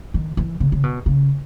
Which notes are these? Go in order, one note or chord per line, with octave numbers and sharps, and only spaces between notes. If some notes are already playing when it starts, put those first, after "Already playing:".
D#3
E3
C#3
C#3
B2
C#3